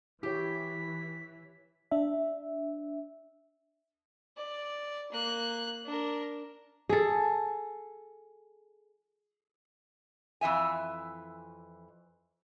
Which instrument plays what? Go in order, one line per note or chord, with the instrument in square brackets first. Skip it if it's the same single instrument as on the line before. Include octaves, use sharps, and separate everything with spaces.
[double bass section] E3 [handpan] E4 C#5 [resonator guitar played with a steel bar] G4 [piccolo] B6
[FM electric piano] D4 E5
[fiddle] D5
A#3 F#6
D4 A#4
[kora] G#4 A4
[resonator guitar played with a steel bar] F2 E3 E5 G#5